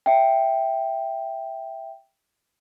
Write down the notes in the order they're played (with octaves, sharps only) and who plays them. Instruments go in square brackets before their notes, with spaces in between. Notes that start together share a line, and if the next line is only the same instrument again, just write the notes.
[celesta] E5 G5